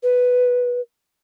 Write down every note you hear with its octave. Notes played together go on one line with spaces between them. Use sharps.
B4